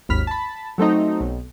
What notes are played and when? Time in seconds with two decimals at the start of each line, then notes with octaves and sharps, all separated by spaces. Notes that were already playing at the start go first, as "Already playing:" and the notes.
0.09 G#1 D#2 B5 F6 B6
0.27 A5 B5
0.78 F#3 A3 C4 D#4
1.20 B1